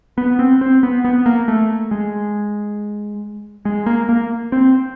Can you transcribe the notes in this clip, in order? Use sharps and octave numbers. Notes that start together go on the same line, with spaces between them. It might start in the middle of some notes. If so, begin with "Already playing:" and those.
B3
C4
C4
B3
B3
A#3
A3
G#3
G#3
A#3
A#3
C4